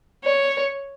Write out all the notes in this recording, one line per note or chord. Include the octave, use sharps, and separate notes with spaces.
C#5